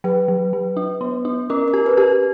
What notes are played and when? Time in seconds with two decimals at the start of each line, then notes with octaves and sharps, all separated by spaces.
0.04 F#3 B4
0.28 F#3
0.53 F#3
0.77 D4
1.01 B3
1.25 D4
1.50 C#4 A#4
1.68 A#4
1.74 G4
1.86 B4
1.97 G4